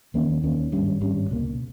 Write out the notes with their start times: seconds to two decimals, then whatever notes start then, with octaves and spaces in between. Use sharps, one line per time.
0.14 D#2 D#3 A#3 C#4
0.43 D#2 D#3 A#3 C#4
0.72 G#1 G2 G3 C#4
1.01 G#1 G2 G3 C#4
1.31 C#2 B2 A#3